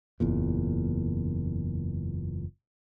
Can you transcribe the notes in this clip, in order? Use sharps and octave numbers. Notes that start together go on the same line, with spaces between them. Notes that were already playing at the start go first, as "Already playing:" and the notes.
F#1 E2 A#2